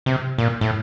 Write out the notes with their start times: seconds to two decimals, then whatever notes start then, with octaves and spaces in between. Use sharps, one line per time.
0.06 C3
0.38 A#2
0.61 A2